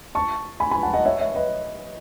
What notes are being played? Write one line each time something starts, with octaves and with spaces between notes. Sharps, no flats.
A5 C#6
G#5 B5
G#5 B5
F#5 A5
D#5 F#5
C#5 E5
C#5 E5
B4 D#5